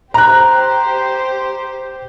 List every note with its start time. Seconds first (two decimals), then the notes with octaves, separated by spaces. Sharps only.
0.14 G4 C5 A#5 F#6